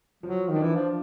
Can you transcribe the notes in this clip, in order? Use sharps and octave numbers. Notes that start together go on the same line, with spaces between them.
F3 F#3
D#3
D4
E3
F3